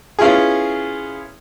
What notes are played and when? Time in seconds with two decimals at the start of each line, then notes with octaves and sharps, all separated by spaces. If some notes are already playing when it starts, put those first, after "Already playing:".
0.19 B3 C#4 E4 F4 G#4